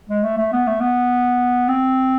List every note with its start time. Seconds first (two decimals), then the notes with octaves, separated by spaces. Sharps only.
0.09 G#3
0.23 A3
0.37 A3
0.52 B3
0.67 A3
0.80 B3
1.68 C4